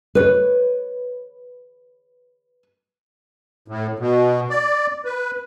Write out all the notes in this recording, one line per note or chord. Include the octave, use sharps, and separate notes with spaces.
B4 C#5
A2
B2
D5
B4